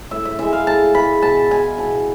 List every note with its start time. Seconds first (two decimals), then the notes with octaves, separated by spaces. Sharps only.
0.11 A2 E5
0.25 E5
0.39 E3 G#3 E5
0.53 F5
0.67 A2 A5
0.95 E3 G#3 B5
1.22 B2 A5
1.51 G#3 G#5
1.78 B2 A5